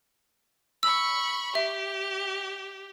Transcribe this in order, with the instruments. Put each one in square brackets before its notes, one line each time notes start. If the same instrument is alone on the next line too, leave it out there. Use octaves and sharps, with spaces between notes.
[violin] B5 C#6 [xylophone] E6
[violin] G4 [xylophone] E5